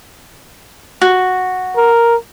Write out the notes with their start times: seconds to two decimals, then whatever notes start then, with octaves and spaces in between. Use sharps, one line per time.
1.02 F#4
1.77 A#4